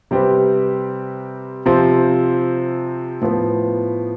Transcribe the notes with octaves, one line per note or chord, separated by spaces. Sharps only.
C3 G3 C4 G4 B4
C3 F3 C4
A2 F3 B3